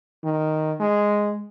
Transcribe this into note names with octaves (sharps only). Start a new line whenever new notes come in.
D#3
G#3